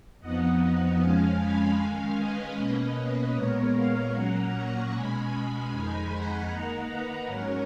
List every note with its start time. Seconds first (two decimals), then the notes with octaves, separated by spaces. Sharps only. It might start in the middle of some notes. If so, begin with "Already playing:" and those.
0.20 F2 F3 B3 D#4 D#5 F#5
0.99 F2 F3 G#3 C#4 F5 G#5
1.38 G#5 B5
1.77 D#3 G#3 C#4 F5 G#5
2.17 B4 D#5
2.56 B2 A#3 C#4
3.34 A#2 G#3 B3 A#4 C#5
3.74 C#5 F5
4.13 A#2 F#3 A#3 C#4 F#5 A#5
4.52 A#5 C#6
4.92 B2 G#3 C#4 G#5 B5
5.71 F2 D#3 G#3 D#4
6.10 F#5 A#5
6.49 D#3 A#3 D#4
6.88 B4
7.27 G#2 F#3 C#4 A#4 C#5